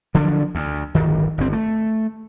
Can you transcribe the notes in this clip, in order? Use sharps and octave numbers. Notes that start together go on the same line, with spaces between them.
D3 F3 F#3 D4
D2
D1 G1 D#3
G1 C4
A3